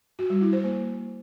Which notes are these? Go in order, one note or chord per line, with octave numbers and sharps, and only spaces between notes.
F#4
G3
E4
C5
A#3